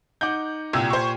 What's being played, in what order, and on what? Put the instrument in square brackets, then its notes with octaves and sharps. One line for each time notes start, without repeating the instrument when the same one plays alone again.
[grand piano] D#4 F#5 D6 [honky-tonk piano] G6
[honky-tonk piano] C2 E6 G#6 [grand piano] A#2 G4
[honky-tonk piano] C5 C#6